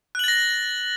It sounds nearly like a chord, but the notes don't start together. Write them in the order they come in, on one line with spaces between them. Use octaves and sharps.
F#6 F#7 A6 A#6